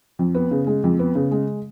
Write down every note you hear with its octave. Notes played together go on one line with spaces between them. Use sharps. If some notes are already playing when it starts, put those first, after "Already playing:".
F2
B3
C#3
G#3
F2
B3
C#3
G#3